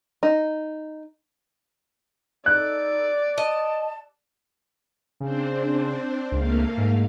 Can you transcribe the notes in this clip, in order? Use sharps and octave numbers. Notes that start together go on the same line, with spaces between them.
D#4
D#4 A4 D5 F#6
D#5 A5
C#3 C4 D4 C5
C#2 A3 A#3 F5
G#2